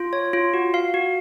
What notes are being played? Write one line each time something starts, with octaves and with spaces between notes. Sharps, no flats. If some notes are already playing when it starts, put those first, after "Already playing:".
Already playing: F4
C#5
F4
F#4
F5
F#4